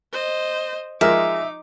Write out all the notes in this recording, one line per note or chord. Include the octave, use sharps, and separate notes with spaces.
C5 D#5
F3 G#3 D#4 A#4 E5 D6